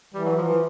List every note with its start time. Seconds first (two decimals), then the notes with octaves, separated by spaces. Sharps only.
0.14 E3 G3
0.25 F#3
0.37 E3 F3
0.48 F3